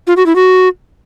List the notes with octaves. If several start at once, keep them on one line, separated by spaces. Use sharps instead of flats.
F4
F#4
E4
F#4